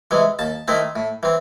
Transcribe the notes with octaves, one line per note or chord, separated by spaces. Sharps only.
C3 E3 G#3
D#2 A5
D#3 A3 C4 E4
A2
E3 C4